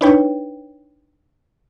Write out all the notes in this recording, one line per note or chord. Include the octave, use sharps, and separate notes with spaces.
D4 D#4 B4 C#5 G5